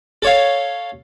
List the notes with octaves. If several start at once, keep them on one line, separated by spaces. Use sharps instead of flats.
A4 C#5 F5